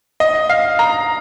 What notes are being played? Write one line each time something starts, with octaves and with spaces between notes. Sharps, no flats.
D#5
F5
A#5